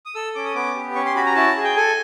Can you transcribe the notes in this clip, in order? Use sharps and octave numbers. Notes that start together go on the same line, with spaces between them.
D#6
A4 E6
C#4 D6
D#6
B3 D6
G4
C#4 C#6
C6
F#4 B5
A#5
E4 A5
G#4
G5
A4 G#5